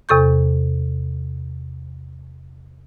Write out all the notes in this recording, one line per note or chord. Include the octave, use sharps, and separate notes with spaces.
E2 C3 A4 C#6 G6